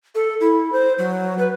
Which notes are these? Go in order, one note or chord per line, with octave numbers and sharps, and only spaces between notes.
A4
E4
C5
F#3
B4